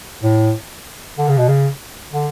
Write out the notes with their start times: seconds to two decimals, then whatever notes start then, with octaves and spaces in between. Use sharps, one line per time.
0.23 A2
1.18 D3
1.28 C#3
1.38 B2
1.48 C#3
2.13 D3